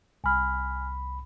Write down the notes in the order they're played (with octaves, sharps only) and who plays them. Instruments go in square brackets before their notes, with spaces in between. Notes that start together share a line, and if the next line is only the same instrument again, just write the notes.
[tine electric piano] C2 B5 [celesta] G#5 F6